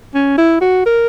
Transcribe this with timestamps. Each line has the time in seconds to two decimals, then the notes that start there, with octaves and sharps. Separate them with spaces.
0.14 C#4
0.38 E4
0.61 F#4
0.86 A#4